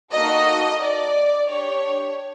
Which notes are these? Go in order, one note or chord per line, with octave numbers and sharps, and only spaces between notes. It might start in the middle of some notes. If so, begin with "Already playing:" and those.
A#3 D#4 F#4 A4 D#5
D5
D4 G4 C#5